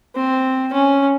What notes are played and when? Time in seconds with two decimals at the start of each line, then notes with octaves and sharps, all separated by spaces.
0.16 C4
0.73 C#4